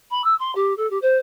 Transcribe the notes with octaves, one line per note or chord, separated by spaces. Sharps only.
B5
E6
C6
G4
A4
G4
C5